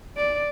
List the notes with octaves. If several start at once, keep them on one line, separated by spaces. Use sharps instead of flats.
D5